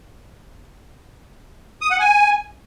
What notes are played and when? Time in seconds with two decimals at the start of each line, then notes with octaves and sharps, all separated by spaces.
1.81 D#6
1.91 F#5
2.00 G#5